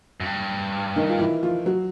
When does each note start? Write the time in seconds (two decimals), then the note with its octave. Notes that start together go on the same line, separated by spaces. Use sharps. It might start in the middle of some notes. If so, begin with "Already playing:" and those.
0.20 F#2
0.26 G2
0.96 D#3 D#4
1.09 F4
1.19 E3 E4
1.43 F3 F4
1.66 F#3 F#4